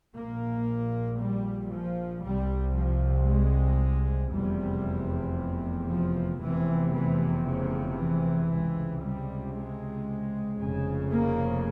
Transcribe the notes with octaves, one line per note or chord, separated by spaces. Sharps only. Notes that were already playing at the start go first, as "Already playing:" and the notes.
A#1 A#2 A#3
G3
F3
C2 C3 G3
F3
G#3
F1 E2 C3 G3
F3
F1 E2 C3 E3
E3
C#3
E3
C#2 C3
G3
G#3
F1 F2 C#3
A#3